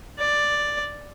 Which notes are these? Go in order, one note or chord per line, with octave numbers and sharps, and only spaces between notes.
D5